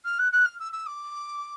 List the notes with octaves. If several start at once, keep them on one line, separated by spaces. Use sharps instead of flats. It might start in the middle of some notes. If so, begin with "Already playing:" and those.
F6
F#6
F#6
F6
E6
E6
D6